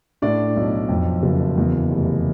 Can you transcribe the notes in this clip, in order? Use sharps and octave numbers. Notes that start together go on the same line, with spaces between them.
A2 D4 D5
B1
F2
F#1
E2
F1